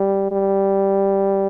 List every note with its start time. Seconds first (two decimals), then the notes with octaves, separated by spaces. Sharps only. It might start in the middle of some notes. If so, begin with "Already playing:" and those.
Already playing: G3
0.32 G3